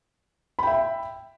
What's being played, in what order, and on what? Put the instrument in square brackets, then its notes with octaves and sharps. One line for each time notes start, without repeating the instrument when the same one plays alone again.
[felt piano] B5
G5
E5